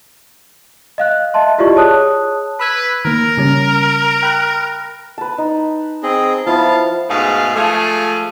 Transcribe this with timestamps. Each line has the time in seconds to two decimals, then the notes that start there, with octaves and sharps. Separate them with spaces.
0.98 D#5 F5 F#6
1.34 D#5 E5 A5 C6
1.58 E4 F4 G4 D5 D#5 C#6
1.75 G#4 C#5 A5 D#6 F#6
2.60 B4 B5 E6 G#6
3.05 D#3 A#3 A#4
3.37 C#3 G3 C#4
4.23 G5 B5 F#6
5.18 B4 A5
5.38 D#4
6.03 C4 G#4 D#5
6.46 F3 B3 E4 F5 A5
7.09 G#2 B2 A3 G#4 F5
7.55 F3 G#3 A3 F4 G#4